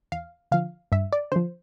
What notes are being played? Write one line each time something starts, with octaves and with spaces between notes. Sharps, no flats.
E2 F5
D3 F3 F5
G2 E5
D5
D3 F3 C5